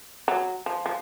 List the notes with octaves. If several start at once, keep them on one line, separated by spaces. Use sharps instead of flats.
F#3
F3
F3